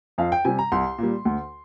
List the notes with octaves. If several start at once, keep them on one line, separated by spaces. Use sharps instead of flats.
F2 F5
G5
C3 G3 G#5
A#5
C2 C6
A#2 G3
D2